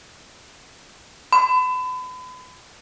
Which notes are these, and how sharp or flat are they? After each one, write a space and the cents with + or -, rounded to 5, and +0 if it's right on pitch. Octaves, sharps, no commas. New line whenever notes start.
B5 +35